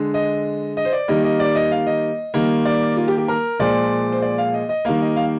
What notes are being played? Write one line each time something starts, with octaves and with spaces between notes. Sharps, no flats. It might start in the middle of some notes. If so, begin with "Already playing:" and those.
Already playing: D3 G#3
D#5
D#5
C5
D5
D#3 G3 A#3 D#5
D#5
D5
D#5
F5
D#5
D#3 G3 A#3
D5
F4
G4
G4
A#4
A#2 F3 G#3 D5
C5
D5
F5
D#5
D#5
D#3 G3 A#3 F5
D#5
F5